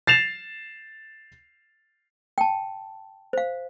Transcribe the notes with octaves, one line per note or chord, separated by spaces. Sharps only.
A6 C7 E7 F7
G5 A5
C5 F5